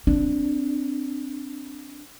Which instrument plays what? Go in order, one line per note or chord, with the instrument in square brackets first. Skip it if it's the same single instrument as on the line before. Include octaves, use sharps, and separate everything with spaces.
[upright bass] C4 [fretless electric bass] D4